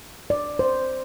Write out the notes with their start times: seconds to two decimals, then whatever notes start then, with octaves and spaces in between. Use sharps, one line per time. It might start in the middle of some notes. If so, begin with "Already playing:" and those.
0.30 D5
0.59 C5